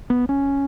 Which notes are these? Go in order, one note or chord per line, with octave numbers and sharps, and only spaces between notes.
B3
C#4